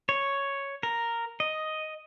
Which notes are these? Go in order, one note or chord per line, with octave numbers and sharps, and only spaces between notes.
C#5
A#4
D#5